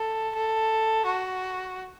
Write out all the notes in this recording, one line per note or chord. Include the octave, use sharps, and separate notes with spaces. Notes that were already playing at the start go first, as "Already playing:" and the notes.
Already playing: A4
A4
F#4